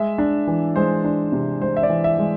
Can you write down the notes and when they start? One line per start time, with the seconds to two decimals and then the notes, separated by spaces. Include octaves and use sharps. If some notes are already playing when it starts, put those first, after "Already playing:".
Already playing: G#3 E5
0.18 D4
0.47 E3
0.76 G#3 C5
1.04 D4
1.32 C3
1.61 G#3 C5
1.77 E5
1.83 D5
1.89 E3
2.04 E5
2.19 G#3